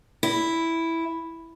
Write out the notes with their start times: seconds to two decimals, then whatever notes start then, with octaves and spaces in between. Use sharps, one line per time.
0.23 E4